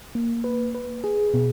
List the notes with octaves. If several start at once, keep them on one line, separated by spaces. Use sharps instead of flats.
A#3
B4
B4
G#4
B2